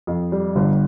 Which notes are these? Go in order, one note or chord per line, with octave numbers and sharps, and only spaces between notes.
F2
G3
G1